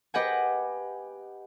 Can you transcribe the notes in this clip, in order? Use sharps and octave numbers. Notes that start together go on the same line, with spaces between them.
G4 B4 D#5 F#5 G#5